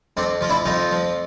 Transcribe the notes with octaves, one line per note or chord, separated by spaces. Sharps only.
F2 C4 D4
F3 F4
D4 E4
F2 D#4 F4
F3